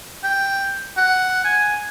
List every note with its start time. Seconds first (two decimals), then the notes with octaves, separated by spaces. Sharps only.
0.24 G5
0.97 F#5
1.45 G#5